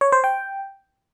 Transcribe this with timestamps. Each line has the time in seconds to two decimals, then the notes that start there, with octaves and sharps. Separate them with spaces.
0.01 C#5
0.12 C5
0.24 G5